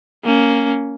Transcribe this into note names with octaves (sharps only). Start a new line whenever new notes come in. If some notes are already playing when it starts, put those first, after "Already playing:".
A#3 C#4